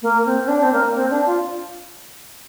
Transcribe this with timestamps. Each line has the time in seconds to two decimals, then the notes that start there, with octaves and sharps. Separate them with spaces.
0.02 A#3
0.25 C4
0.44 C4
0.48 D4
0.63 C4
0.72 A#3
0.95 C4
1.10 D4
1.26 F4